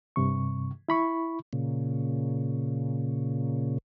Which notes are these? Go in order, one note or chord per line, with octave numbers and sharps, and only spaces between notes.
G2 C3 C#6
E4 B5 C#6
A#2 C#3